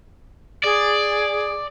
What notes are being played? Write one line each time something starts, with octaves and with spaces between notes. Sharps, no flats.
G#4 D5